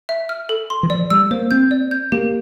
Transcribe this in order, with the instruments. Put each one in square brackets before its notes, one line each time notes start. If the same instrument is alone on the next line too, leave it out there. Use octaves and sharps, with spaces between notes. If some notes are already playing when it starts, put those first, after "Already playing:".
[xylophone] E5
F6
A4
C6
[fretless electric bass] E3
[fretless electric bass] F3 [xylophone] D5
[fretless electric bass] G3 [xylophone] E6
[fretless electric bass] A#3 [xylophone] C5
[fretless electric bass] C4 [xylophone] G6
[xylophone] D5
G6
[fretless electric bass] A#3 [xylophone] G4